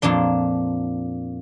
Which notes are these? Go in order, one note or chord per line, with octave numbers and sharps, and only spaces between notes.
F2 A#2 D4 C6